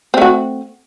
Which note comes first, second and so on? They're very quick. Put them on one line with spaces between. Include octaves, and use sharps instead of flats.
C4 A3 F#4